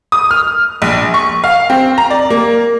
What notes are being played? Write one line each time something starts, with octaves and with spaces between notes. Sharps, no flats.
D#6
F6
A#1
C#6
F5
C4
A#5
D5
A#3